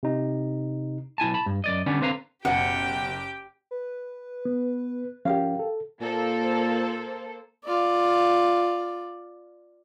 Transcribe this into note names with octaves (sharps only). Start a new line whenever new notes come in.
C3 D#4
B1 E4 G#5 A5
A5 B5
G2
F#2 D5 D#5
D3 G3 B3 C#4 D4
D3 C4 B4 F5 A#5
F#1 B2 G4 F#5 G5
B4
B3
F3 C#4 G4 A#4 F5
A4
A#2 A#3 A4 C5
F4 D5